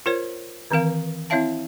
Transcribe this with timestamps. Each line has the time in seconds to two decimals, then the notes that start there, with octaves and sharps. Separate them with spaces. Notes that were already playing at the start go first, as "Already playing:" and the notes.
0.06 F4 A#4 C5 C#5
0.71 D#3 E3 C4 A#4 F5
1.30 C4 E4 C#5 E5 F5 A5